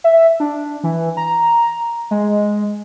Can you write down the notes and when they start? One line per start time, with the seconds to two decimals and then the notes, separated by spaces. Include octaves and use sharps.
0.04 E5
0.40 D4
0.84 E3
1.17 A#5
2.11 G#3